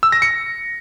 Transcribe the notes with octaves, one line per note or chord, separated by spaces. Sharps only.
E6
A#6
C#7